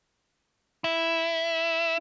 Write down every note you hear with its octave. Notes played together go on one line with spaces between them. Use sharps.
E4